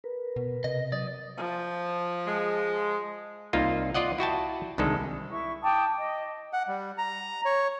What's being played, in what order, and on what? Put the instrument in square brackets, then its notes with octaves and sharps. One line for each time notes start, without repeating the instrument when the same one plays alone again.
[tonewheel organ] A#4 B4
[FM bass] B2
[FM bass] C3 [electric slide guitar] D#5
[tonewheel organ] F#3 D#6 [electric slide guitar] D5
[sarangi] F3
[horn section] G#3
[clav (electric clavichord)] C2 A#3 D#4 F4
F4 D5 D#5 F#5
E4 F#4 G5 A5
C2 D3 D#3 G#3 A4
[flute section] E4 C#6
G5 A5 D6 D#6
D#5
[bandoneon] F#5
G3
A#5
C#5